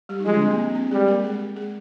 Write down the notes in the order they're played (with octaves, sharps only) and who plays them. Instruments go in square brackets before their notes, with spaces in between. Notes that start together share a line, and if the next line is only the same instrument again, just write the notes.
[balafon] G3 G4
D#4
[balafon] F3 F4 [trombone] G#3
[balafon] D3 D4
C4
A#3
C4
A#3
C4
[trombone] G3 [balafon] G#3 G#4
[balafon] A#3 A#4
G#3 G#4
G#3 G#4